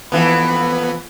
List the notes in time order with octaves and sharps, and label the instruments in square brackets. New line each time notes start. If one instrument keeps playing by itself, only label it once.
[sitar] F2 E3 [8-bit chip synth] B3 [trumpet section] B5